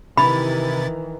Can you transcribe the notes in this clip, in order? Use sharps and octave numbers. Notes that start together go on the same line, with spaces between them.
C3 D#3 E3 E4 B5 A6